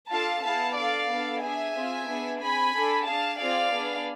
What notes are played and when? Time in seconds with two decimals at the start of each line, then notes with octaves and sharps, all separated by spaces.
0.11 D4 F4 A4 F5 A5
0.44 B3 E4 G#4 F5 A5
0.76 D4 A4 D5 F5
1.09 B3 D4 A4
1.43 D4 G#4 E5 G#5
1.75 C4 F4 G#4
2.08 B3 D4 G#4
2.41 C4 G#4 G#5 B5
2.74 D4 A4
3.07 D4 G#4 F5 A5
3.39 C4 F4 G#4 D5 F5
3.72 B3 D4 G#4